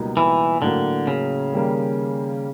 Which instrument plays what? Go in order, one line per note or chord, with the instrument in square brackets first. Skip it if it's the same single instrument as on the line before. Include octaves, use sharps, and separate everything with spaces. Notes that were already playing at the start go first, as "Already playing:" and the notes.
Already playing: [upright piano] C#2 B2 G3 A#3 D#4
[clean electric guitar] E3
[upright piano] A2 F#3 A#3 [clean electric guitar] D3
[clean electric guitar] C#3
[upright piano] D#3 G3 A#3